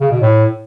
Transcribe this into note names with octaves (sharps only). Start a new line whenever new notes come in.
C#3
B2
A2